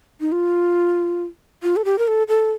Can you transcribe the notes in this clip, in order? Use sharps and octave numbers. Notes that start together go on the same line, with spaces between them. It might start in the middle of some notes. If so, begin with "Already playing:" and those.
D#4
F4
F4
A4
G4
A#4
A4
A4